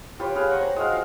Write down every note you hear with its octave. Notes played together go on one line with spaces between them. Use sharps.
F4 G4 B4 C#5
G4 G#4 B4 F5
F#5 G5 A#5 C#6
C5 A#5
G#3 F#4 F5
F4 F5